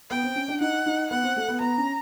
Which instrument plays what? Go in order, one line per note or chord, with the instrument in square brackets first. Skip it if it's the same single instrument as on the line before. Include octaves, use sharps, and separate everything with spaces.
[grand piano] B3 [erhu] G5
[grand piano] C4
C#4
D4
[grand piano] D#4 [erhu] F#5
[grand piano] D#4
[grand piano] B3 [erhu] F#5
[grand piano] C4
A3
B3
[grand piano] B3 [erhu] A#5
[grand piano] C#4